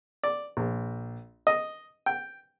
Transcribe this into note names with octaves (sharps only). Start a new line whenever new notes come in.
D5
A#1
D#5
G5